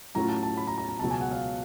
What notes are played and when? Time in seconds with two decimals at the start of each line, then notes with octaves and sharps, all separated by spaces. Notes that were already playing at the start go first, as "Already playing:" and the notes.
0.15 A2 F#3 A3 C#4 F4 A#5
0.29 A5
0.43 A5
0.57 B5
0.67 A#5
0.78 A#5
0.89 A#5
0.99 C#2 B2 F#3 A5
1.11 G#5
1.21 F#5
1.31 F5